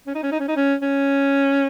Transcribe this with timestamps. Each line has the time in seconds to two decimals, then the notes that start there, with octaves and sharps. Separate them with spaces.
0.07 C#4
0.15 D#4
0.23 C#4
0.32 D#4
0.40 C#4
0.48 D#4
0.56 C#4
0.82 C#4